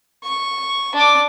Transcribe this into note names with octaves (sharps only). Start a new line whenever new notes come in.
C#6
D4 D6